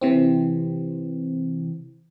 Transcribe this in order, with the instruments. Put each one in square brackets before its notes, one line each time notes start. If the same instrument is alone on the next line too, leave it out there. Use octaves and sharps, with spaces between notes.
[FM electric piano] C3 E3 C4